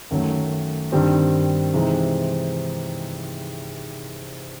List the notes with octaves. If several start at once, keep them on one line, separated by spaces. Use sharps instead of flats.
F#2 D#3 F#3 A3
G2 D#3 G3 C4
C3 E3 G#3 C4 D#4